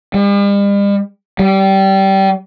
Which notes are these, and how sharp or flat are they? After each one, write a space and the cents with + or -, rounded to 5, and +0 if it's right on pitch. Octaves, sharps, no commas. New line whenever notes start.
G3 +45
G3 -20